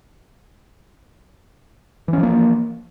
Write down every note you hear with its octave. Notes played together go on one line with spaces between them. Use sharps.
E3 F3 A#3 C#4